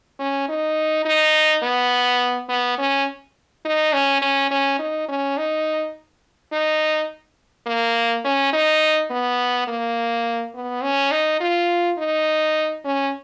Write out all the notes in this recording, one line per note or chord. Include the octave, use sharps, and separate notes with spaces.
C#4
D#4
D#4
B3
B3
C#4
D#4
C#4
C#4
C#4
D#4
C#4
D#4
D#4
A#3
C#4
D#4
B3
A#3
B3
C#4
D#4
F4
D#4
C#4